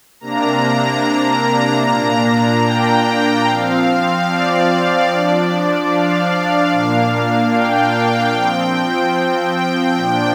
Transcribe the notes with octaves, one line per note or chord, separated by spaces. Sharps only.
C3 A#3 D4 A#5
A#5
A#2 A#3 D4
G5
F3 C4 F5
D5
F3 D4
F5
A#2 A#3 D4
G5
F3 C4
G5
G5
A#2 F3 D4